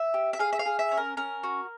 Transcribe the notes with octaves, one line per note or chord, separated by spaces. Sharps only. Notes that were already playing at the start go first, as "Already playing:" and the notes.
Already playing: E5
G4
E5
G#4 F5
E5
F5
G#4
E5
C#4
A#4
C#4 A#4
F#4